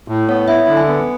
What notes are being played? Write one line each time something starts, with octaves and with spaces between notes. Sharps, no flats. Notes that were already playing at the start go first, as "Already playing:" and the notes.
A2
B3 C#5
E4 E5
D3
G#5
B3